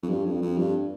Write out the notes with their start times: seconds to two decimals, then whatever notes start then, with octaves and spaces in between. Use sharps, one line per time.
0.03 F2
0.09 G2
0.25 F2
0.42 F2
0.57 G2